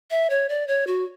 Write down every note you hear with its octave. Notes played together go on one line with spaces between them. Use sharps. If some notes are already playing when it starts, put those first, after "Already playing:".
E5
C#5
D5
C#5
F#4